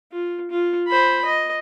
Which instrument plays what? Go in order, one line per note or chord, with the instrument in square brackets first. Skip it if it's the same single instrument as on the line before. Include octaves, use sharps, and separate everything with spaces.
[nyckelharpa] F4
F4
C5 B5
D#5